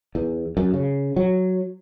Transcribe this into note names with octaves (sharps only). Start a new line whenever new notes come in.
E2
F#2
C#3
F#3